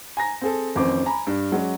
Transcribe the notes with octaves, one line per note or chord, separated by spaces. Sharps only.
G#5 A#5 A#6
C4 G#4 A4
A1 F2 D#3 C#4 C5 D6
G#5 A#5 B5
G2
F#3 G#3 C#4